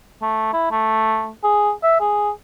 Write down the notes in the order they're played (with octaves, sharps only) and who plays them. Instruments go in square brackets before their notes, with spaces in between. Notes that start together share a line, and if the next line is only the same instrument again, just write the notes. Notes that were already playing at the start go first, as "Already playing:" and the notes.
[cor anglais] A3
E4
A3
G#4
E5
G#4